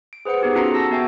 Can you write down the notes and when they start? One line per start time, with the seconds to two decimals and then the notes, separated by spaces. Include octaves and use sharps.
0.13 D7
0.25 G#4 B4 C5 F#5 C#7
0.42 B3 D#4 G4 G#4
0.55 C#4 F4 F#4 A4 A#5 C#7
0.74 A5 E6 A#6
0.91 B3 F#4 E5 G5 G#5